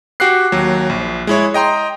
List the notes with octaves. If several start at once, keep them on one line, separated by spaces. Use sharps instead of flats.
F#4 G4 D6 F#6 C7
D#2 F#3
A#1
G#3 E4 C#5
D#5 G5 A#5 C6